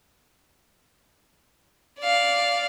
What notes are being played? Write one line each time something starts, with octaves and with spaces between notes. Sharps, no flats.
D5 F5